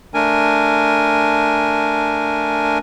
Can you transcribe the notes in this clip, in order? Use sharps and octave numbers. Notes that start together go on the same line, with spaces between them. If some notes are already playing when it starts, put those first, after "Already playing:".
A3 D4 A#4 G#5